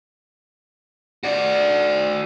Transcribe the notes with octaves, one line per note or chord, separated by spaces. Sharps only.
F#4 D5